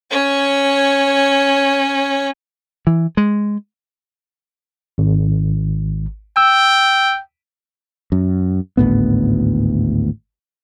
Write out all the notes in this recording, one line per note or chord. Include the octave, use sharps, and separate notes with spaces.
C#4 C#5
E3
G#3
G#1
G5 E6
F#2
G#1 D2 A2 B3